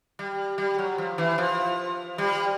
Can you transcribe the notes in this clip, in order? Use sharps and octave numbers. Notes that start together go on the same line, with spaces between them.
G3
G3
F#3
F3
E3
F3
G3